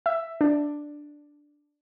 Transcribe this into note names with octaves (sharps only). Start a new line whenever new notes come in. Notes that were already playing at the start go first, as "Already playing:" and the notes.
E5
D4